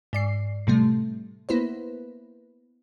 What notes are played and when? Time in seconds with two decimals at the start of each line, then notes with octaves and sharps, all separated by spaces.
0.13 G#2 D5 C7
0.67 A2 C3 G3 A3
1.49 A#3 B3 E4 B4 C5